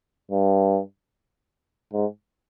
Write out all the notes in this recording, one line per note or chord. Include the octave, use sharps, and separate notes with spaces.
G2
G#2